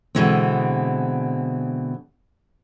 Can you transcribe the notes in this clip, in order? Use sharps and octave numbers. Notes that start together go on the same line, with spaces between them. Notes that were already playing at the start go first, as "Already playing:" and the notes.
B2 D3 E3 G#3 C4